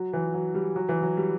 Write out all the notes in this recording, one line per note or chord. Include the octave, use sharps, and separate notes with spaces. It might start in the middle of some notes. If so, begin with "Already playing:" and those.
Already playing: F#3
E3
F#3
G3
F#3
E3
F#3
G3